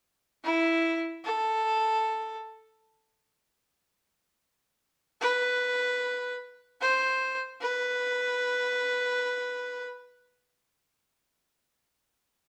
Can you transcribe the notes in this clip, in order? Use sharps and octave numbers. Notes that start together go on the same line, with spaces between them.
E4
A4
B4
C5
B4